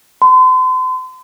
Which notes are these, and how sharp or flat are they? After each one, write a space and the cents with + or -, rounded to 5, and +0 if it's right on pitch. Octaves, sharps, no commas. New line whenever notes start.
C6 -40